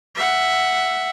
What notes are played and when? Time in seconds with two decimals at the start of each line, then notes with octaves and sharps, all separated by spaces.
0.15 E5 F#5